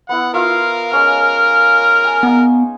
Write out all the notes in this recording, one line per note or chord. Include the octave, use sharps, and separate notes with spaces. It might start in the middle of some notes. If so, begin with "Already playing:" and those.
B3 E4 F#5
F4 A#4 E5 F5
G#3 C#4 F5 F6
G#5
B3 D#4